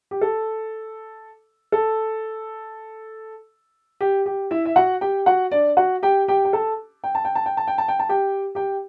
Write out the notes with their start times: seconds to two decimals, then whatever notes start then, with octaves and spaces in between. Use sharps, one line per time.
0.11 G4
0.21 A4
1.72 A4
4.01 G4
4.26 G4
4.51 E4 E5
4.65 E5
4.76 F#4 F#5
5.01 G4 G5
5.26 F#4 F#5
5.51 D4 D5
5.77 F#4 F#5
6.03 G4 G5
6.28 G4 G5
6.45 G5
6.53 A4 A5
7.04 G5
7.15 A5
7.25 G5
7.35 A5
7.46 G5
7.57 A5
7.67 G5
7.78 A5
7.88 G5
7.99 A5
8.09 G4 G5
8.55 G4 G5